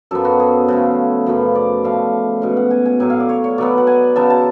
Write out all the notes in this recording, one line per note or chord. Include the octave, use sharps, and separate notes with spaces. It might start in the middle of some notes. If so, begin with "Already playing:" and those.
F#2 F3 B3 A4
F#4
G#4
C#3 F3 A3
F#2 C#3 F3 B3
D5
C#3 F3 A3 F5
B2 G#3 C#4
F#5
G#5
G#5
A2 F#3 C#4 G#5
F5
D5
C#5
C#5
B2 F#3 B3 D5
F#5
G#5
C#3 F#3 B3 A5
A5